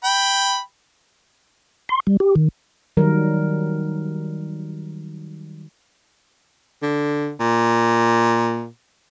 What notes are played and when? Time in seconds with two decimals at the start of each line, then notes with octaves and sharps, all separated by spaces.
0.04 G5 B5
1.89 C6
2.07 G3
2.20 G4
2.36 D#3
2.97 D#3 F#3 G3 A#4
6.82 D3
7.40 A#2